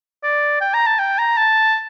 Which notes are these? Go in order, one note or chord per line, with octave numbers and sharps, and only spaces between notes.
D5
G5
A#5
A5
G5
A#5
A5